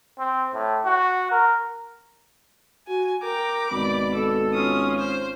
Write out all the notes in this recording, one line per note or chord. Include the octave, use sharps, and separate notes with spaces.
C4
A2
F#4
A#4
F#4 G#5
A#4 G5 A#5 D6
G#1 B2 D5 B5
A4
C#4 F4 D#6
C5